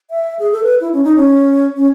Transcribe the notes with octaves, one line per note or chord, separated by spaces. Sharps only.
E5
G#4
A4
B4
E4
C#4
D#4
C#4
C#4